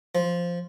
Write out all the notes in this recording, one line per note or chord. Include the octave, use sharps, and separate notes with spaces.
F3